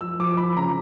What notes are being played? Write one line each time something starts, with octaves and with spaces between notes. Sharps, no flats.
F3 E6
F3 D6
F3 B5
C#3 A#5